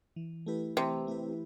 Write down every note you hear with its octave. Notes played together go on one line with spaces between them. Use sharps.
E3
A3 E4 G4 B4
C3 E3
A3 E4 G4 B4